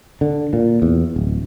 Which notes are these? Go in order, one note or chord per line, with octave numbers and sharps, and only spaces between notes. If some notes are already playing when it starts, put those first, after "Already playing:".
D3
A#2
E2
D1